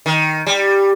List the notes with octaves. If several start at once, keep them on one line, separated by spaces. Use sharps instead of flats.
D#3
G3